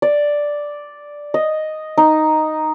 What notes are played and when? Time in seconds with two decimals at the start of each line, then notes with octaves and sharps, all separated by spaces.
0.02 D5
1.34 D#5
1.98 D#4